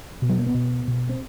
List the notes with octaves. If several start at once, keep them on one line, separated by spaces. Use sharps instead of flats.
B2
F#3
A#3
B3
B2
B2
C4